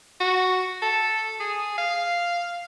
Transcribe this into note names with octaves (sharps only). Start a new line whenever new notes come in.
F#4
A4
G#4
F5